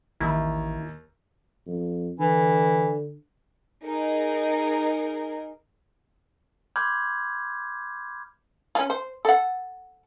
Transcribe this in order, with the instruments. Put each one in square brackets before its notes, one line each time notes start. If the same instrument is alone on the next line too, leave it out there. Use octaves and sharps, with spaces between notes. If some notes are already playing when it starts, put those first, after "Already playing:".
[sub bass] A1 [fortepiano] D#2 [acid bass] E4
[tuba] F2
[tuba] D3 [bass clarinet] E3
[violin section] D#4 G#4 A#4
[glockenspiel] B5 C6 D6 F6 G6 G#6
[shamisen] C#4 F4
C5
A4 F#5